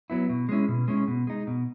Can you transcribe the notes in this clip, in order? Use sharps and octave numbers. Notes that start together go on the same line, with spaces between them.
F#3 B3 E4
B2
G#3 C#4 E4
B2
G#3 C#4 E4
B2
G#3 D#4
B2